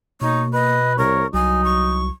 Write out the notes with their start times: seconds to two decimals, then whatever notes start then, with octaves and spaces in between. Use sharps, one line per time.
0.21 B2 A#3 D#4 C#5
0.53 B4 D#5
0.98 C2 A#4 C#5
1.34 C2 F#3 D#4 G#5
1.64 C#6